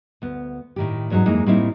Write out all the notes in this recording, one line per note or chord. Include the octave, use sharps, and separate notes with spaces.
D2 B3
A2 D#3 G4
E2 G#2 F#3 C#4 D#4
F2 E3 G#3 A#3 D#4
A2 G3 A#3 C4 D#4 E4